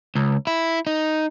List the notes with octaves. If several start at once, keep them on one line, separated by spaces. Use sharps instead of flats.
C#2
E4
D#4